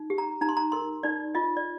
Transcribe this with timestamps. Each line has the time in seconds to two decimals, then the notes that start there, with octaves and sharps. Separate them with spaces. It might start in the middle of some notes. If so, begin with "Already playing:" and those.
Already playing: D#4
0.10 G4
0.18 A#5
0.41 D#4 A#5
0.49 C6
0.57 A#5
0.72 A#4 C6
1.03 D#4 D5
1.35 F4 D#5
1.57 D5